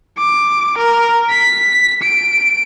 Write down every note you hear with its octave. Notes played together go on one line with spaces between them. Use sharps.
D6
A#4
B6
D7